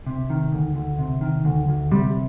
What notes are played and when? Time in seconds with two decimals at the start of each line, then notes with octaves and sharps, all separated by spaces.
0.07 C3
0.30 D#3
0.52 D2
0.75 D2
0.99 C3
1.21 D#3
1.45 D2
1.68 D2
1.91 C3 G3